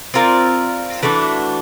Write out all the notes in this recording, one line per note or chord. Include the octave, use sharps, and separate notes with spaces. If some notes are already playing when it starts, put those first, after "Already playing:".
C4 F4 A#4 D5
E3 A3 D4 F#4